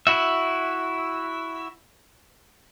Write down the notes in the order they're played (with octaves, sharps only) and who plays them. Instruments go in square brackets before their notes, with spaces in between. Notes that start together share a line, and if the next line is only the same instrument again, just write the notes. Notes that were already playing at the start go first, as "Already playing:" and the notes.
[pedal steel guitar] E4 F#4 E5